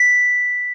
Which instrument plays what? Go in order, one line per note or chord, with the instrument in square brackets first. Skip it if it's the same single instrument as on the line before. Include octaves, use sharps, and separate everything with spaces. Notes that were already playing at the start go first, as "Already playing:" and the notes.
Already playing: [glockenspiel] B6